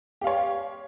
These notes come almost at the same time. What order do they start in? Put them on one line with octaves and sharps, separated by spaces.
G4 F5 C#5